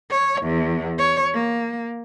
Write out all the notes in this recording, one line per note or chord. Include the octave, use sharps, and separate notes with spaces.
C#5
E2
C#5
A#3